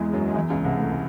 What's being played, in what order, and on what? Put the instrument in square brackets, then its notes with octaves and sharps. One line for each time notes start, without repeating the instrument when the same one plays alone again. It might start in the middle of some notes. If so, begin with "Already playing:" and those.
Already playing: [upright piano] E2 E3 [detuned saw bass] G#3
[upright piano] F#2 F#3
E2 E3
C#2 C#3
C2 C3
[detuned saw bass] A3